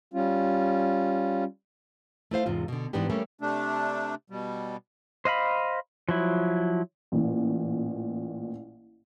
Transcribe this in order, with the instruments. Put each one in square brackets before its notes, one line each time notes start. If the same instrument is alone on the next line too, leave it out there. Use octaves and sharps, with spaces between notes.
[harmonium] G3 C#4 F4
[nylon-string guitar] A3 E4 C5 F5
E2 G#2 C3 F4
B2 D3
G#2 E3 B3 D4 G4
G3 A3 A#3 C#4
[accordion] C3 A3 D4
B2 G3
[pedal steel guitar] C5 D#5 F5 B5
F3 F#3 E4
[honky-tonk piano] A1 A#2